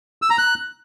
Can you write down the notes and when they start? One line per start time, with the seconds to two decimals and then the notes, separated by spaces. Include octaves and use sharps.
0.22 E6
0.30 A#5
0.38 F#6